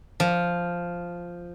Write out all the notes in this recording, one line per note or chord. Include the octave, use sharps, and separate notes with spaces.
F3